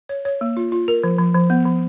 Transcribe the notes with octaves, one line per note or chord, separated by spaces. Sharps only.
C#5
C#5
A#3
F4
F4
A#4
F3
F3
F3
B3
F3